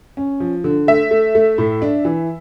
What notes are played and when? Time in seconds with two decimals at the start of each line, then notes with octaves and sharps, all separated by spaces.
0.17 C#4
0.40 F3
0.64 D3
0.87 A3 E5
1.11 A3
1.35 A3
1.58 A2
1.82 D4
2.05 E3